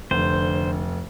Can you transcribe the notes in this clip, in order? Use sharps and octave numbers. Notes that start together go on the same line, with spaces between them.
F1 D3 C5